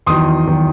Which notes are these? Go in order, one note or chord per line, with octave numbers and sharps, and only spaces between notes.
E2 D#3 F#3 C6 D#6
E2 D#3 F#3